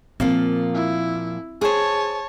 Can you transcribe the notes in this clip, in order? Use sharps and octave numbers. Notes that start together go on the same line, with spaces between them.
A#2 F3 A#3 C4
E4
G#4 C5 C#5 A5